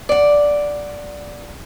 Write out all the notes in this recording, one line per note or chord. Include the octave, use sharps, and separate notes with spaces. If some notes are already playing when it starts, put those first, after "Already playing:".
D5 F#5